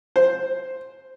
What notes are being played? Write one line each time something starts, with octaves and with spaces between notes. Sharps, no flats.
C5